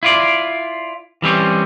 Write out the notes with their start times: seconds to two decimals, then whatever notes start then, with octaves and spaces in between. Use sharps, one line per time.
0.03 E4 F4 D5
1.22 E3 G3 C4 C#4